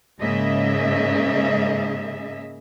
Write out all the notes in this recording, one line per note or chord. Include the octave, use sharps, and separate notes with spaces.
G#2 C#3 A#3 G#4 D#5 E5